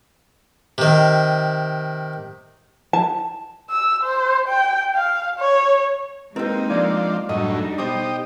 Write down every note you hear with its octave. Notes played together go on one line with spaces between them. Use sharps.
C3 D#3
A5
E6
C5
G5
F5
C#5
G#3 A#3 C4 D#4 E4 G4 A#4 B4
F3 D4 D5 E6
F#2 A2 G3 D4 D#4 D#5
B2 G4 C5 D#5 D6